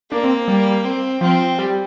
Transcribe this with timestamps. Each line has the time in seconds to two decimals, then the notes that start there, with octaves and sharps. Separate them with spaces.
0.12 A#3 D4
0.24 C4
0.48 G3
0.84 C4
1.21 F3 C4
1.59 G3